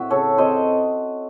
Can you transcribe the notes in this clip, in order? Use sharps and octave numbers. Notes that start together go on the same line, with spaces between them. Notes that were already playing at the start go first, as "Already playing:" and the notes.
Already playing: A2 C4 E4 F#4 E5
C#3 A4 C#5
C4 C5 D#5